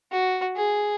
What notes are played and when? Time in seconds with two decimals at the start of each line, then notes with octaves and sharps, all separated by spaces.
0.12 F#4
0.56 G#4